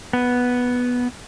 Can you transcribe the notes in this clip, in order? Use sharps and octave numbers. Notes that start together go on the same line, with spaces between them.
B3